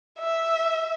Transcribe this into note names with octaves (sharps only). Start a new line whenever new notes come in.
E5